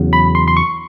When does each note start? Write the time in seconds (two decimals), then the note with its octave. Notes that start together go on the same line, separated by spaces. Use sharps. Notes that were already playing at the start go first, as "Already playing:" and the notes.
Already playing: E2 C#3 F#3
0.13 B5
0.35 C6
0.48 C6
0.57 C#6